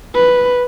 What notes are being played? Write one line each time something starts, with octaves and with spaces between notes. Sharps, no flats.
B4